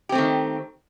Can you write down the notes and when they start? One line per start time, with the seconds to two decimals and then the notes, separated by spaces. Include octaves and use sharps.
0.09 G4
0.12 C4
0.15 A3
0.18 D#3